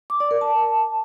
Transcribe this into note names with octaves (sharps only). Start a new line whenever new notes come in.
D6
D5
A#4
A5